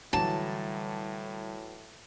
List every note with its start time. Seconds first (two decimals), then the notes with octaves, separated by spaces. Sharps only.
0.13 A2 D3 E3 F#3 G3 A5